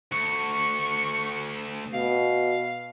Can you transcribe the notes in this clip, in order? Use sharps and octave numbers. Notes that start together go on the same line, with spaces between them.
D2 C#6
B2 F5